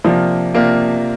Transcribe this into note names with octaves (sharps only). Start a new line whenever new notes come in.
C3 F3 A#3 D4 F4
C3 A#3 D4 F4